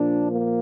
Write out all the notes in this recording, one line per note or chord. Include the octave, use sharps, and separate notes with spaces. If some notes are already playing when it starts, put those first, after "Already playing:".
Already playing: A#2 F3 D4
A#3